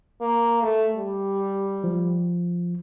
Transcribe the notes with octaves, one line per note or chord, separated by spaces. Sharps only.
A#3
A3
G3
F3